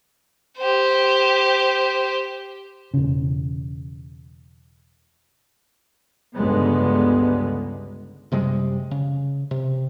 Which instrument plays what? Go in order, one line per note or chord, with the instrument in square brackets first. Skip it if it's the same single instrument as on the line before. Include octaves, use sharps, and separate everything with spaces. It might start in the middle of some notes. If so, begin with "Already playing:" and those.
[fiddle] G4 C5
[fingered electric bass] E1 C#3
[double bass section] G1 C#2 D3 G#3 B3
[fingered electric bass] F#2 C3 G3 G#3
C#3
C3